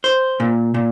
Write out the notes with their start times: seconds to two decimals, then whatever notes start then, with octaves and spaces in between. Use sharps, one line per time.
0.04 C5
0.40 A#2
0.74 A#2